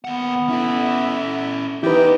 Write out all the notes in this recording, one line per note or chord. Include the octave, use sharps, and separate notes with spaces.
D#2 B3 F#5
C#4 E4 A4
E2 D#4 E4 G4 B4